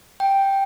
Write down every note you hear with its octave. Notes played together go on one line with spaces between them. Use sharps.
G5